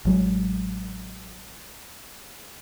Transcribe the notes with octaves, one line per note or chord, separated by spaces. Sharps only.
A1 F#3 G#3